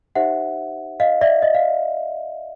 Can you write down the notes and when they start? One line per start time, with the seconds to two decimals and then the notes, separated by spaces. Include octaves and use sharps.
0.15 D#4 G4 C5 E5 F#5
1.00 D#5 F5
1.21 D5 E5
1.42 D#5
1.55 F5